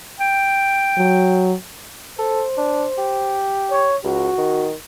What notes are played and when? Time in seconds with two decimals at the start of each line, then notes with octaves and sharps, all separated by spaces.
0.20 G5
0.98 F#3
2.19 A4 C5
2.57 D4
2.98 G4
3.71 C#5
4.04 C#2 F#4
4.38 D#3